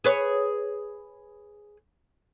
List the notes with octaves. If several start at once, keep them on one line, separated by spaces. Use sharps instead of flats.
G#4 B4 C#5